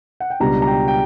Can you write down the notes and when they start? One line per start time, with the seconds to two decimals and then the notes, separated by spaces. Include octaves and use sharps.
0.20 F#5
0.30 G5
0.40 C#2 B2 G3 B3 D4 A#5
0.62 A#5
0.67 G5
0.88 G5